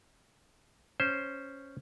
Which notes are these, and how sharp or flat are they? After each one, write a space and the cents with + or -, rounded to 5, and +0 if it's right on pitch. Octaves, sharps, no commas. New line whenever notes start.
C#4 +0 C5 +0